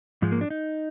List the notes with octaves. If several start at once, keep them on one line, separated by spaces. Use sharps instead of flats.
G#2 F3 G#3
A#3
D4
D#4